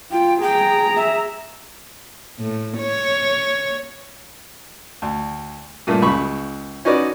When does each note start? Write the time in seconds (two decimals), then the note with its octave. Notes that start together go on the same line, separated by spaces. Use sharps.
0.11 F4 G5
0.42 G#4 G5 A#5
0.96 E5
2.39 A2
2.79 C#5
5.02 D2
5.87 G2 A#2 A3
6.02 C#2 C#3 B5 C#6
6.85 C#4 D#4 F#4 B4 D5